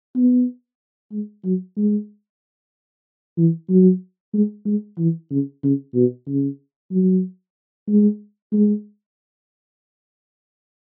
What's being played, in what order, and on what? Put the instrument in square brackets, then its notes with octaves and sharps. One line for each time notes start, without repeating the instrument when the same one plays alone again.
[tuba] B3
G#3
F#3
G#3
E3
F#3
G#3
G#3
E3
C#3
C#3
B2
C#3
F#3
G#3
G#3